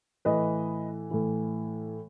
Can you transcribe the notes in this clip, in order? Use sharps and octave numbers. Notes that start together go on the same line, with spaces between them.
A2 E3 B4 D#5
A2 E3